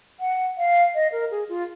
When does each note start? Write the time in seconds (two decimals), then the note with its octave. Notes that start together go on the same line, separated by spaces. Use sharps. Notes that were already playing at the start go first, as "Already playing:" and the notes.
0.20 F#5
0.58 F5
0.95 D#5
1.12 A#4
1.31 G#4
1.49 F4